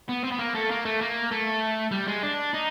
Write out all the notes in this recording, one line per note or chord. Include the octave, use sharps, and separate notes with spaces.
B3
C4
B3
A#3
A3
A#3
A3
A#3
A3
G3
G#3
D4
D#4